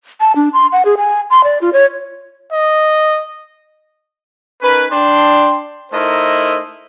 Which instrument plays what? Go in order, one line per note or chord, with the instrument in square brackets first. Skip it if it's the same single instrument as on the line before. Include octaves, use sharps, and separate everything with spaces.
[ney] A5
D4
C6
F#5
G#4
G#5
C6
D5
F4
C#5
[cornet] D#5
[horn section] C#4 D#4 A#4 B4
D4 G5 C6
A3 D#4 E4 A#4 C5 D#5